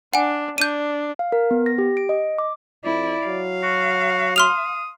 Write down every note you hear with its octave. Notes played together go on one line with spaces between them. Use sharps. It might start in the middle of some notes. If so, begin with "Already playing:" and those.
D4 F#5 G#5
D4 G6 D#7
F5
A#4
B3
A#6
G4
D7
D#5
D6
F2 E4 D5
F#3 F5
F#4
C6 D#6 F6 F7